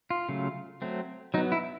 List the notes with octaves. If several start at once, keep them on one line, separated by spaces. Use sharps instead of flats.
F4
C#3 F#3 A3
F#3 A3 C4
F#3 B3 D#4
E4